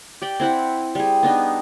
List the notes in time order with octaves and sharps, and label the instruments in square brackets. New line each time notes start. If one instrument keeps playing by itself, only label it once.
[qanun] G4 D5 G5
C4 E4 F#5 B5
G3 G#4
B3 D4 D#4